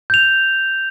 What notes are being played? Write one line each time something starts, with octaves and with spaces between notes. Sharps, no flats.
G6 F7